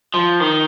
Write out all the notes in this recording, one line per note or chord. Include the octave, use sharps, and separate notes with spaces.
F3
D#3